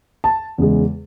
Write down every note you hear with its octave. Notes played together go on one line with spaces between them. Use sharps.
A5
E2 C#3 G#3